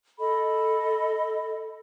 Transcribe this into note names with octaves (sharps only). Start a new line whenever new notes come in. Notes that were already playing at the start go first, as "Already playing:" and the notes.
A4 D#5 B5